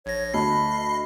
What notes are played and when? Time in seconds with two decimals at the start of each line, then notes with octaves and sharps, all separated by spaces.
0.06 A#1 C#5 G#6 A#6
0.34 D2 D#5 A5 B5 C7